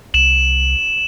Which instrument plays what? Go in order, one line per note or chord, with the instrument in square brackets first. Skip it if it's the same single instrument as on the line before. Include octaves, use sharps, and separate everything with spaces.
[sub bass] C2 [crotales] E7 F#7